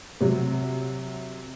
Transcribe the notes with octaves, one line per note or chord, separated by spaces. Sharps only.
C3 F#3